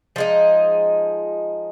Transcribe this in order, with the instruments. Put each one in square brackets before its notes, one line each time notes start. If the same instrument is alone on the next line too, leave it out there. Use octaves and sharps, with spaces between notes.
[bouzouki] F3 G#3 D#4